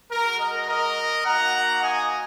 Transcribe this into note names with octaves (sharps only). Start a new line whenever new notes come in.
G#3 F#4 A#4
A#4 D#5
A#4 D#5
A#3 D#4 F#4 F#5 A#5
D#5 G#5